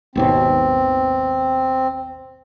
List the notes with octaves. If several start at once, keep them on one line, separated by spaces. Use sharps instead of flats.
G#1 D#2 B2 C4